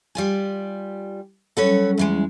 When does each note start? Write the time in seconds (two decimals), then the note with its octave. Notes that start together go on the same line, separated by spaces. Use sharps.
0.15 G3 F4 G#5
1.57 F#3 G3 C#4 A4 B4 C#5
1.98 E2 E3 G#3